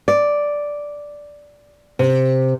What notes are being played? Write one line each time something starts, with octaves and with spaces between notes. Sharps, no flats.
D5
C3